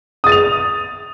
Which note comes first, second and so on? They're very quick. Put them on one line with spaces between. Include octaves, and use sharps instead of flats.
D#6 A6 D#7 F7